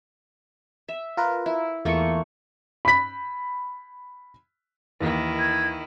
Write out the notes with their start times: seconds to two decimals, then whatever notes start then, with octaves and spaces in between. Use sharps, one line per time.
0.88 E5
1.17 F4 A#4 B4
1.46 E4
1.85 E2 A3 A#3 F4 C#6
2.85 B5 B6
5.00 D#2 D#3 E3 E4
5.39 G#6